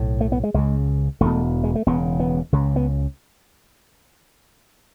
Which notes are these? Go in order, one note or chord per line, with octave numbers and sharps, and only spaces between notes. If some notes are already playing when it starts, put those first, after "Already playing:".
Already playing: B1 A2
A3
B3
G#3
C#2 C#3 G#3
E1 E2 B2 A3
G#3
A3
E1 E2 C#3 B3
B3
C#2 C#3
B3